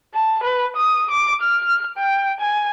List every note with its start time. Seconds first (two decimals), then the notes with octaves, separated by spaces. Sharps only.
0.14 A5
0.43 B4
0.76 D#6
1.11 D6
1.42 F6
1.97 G5
2.40 G#5